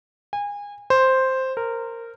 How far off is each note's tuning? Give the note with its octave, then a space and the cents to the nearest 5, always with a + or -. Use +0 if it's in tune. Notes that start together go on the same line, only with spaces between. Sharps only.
G#5 -30
C5 +0
A#4 -15